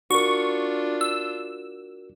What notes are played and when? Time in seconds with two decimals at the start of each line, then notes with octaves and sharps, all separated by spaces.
0.11 D4 F4 F#4 A#4 C#6
1.01 E6